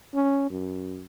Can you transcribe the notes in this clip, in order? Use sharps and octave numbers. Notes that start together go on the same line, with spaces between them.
C#4
F#2